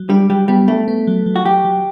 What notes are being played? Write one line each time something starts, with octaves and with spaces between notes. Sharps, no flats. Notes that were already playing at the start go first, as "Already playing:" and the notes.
Already playing: F#3
G3 D4
F#3 G3
G3 B3
A3 D4
B3
F#3
F#3
F#4
F#3 G4
F#3